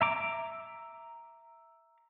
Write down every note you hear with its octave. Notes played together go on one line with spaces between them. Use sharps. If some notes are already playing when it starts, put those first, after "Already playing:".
E5 A#5 D6